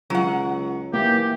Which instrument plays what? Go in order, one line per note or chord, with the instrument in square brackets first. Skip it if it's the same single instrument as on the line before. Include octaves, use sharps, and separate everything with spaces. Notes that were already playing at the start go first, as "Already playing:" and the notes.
[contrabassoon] C#2 [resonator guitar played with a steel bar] F#3 F#5
[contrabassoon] E3 [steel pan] A#3 [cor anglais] G4